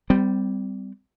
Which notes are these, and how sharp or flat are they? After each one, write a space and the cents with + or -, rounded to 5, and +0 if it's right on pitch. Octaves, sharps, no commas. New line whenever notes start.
G3 +0 C4 -30